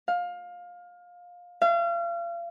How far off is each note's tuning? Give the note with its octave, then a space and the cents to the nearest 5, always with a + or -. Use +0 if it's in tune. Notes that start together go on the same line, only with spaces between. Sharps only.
F5 +20
F5 -35